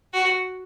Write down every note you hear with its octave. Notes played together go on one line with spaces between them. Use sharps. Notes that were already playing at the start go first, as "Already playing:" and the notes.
F#4